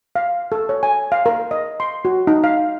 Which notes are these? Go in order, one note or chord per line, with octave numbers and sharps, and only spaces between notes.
F5
A4
C#5
G#5
F5
A#4
D#5
C6
F#4
D#4
F5